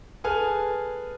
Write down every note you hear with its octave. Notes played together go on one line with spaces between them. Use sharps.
G#4 A4 B4 G#5 F6